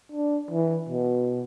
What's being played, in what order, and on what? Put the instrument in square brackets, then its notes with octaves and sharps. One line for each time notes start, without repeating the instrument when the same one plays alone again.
[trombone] D4
E3
B2